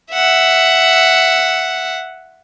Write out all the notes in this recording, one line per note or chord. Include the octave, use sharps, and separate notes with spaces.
E5 F#5